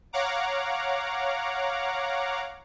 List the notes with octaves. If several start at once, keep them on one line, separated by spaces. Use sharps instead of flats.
C#5 F5 F#5 A#5 D6